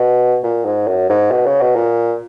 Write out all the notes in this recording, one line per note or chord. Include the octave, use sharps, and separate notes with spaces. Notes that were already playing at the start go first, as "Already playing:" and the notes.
Already playing: B2
A#2
G#2
F#2
G#2
B2
C#3
B2
A#2